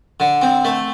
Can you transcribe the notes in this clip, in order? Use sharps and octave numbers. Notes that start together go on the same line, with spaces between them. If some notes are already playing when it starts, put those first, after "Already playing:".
D3
C4
A3